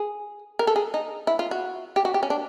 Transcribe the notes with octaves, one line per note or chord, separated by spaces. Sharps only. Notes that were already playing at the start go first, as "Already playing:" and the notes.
Already playing: G#4
A#4
A4
G#4
D#4
E4
F4
F#4
G4
F#4
G4
C#4
D4